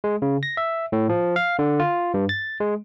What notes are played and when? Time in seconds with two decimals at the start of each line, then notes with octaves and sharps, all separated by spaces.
0.04 G#3
0.22 C#3
0.43 A#6
0.57 E5
0.92 A2
1.09 F3
1.36 F5
1.59 D3
1.80 F4
2.14 G2
2.29 A6
2.60 G#3